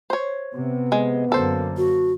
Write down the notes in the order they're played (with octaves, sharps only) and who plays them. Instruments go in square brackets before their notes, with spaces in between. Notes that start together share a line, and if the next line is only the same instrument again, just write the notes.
[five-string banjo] C5 C#5
[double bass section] C3 [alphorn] B3
[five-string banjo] G#3
[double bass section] F#2 D3 A#3 [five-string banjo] A4 C5
[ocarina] F#4